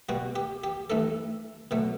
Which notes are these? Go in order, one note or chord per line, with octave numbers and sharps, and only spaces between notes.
B2 G3 F#4
G4
G4
G2 E3 A3 A4
B2 F#3 A3